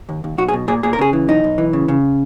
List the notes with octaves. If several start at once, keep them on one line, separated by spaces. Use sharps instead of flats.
D#2
D#2
B1 F#4
G#4
B2
A#2 G#4
A#2 G#4
A#4
C#3 G#4
E3
B1 D#4
B1
E3
C#3
C#3